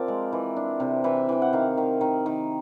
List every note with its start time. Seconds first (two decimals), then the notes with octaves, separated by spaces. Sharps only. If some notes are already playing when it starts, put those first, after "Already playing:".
Already playing: F3 C4 A#4 D5
0.08 G#3
0.32 E3
0.56 D4
0.80 C3
1.04 E3 E5
1.29 E3 G5
1.42 F#5
1.53 D#3 F5
1.78 D#3
2.01 D#3
2.26 D#3